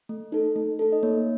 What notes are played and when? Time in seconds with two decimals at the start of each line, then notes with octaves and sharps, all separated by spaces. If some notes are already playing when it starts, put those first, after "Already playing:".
0.09 A3
0.32 D#4 A4
0.56 A3
0.79 D#4 A4
0.92 D#5
1.03 A#3 C#5